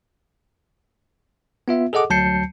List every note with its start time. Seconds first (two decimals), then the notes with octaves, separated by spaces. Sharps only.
1.68 B3 F4 E5
1.93 G#4 A4 D#5 F#5 D6
2.10 D2 F#3 A5 G6 C7 C#7